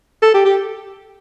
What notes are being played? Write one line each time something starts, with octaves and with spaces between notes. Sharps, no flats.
A4
G4
G4